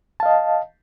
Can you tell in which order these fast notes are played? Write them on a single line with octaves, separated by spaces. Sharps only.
A5 F5 D#5